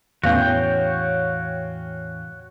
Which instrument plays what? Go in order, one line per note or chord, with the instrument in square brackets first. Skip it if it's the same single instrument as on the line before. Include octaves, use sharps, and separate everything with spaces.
[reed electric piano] E2 A2 E3 [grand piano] C#4 F5 [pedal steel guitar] F#4 C#5 G5